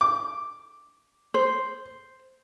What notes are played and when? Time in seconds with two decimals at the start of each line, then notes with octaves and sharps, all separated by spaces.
0.01 D6
1.34 C5